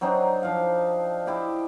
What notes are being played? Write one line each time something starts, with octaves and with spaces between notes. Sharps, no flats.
F#3 C4 D4 D#4
F3 F5
E4 G4 D#5